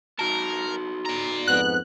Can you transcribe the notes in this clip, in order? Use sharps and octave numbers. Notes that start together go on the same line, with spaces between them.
D#4 F#4 A#4 A5
D5 A#5
F2 G#2 B3 F#6